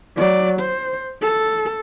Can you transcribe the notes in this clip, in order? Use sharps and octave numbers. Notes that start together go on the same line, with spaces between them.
F#3 D5
C5
A4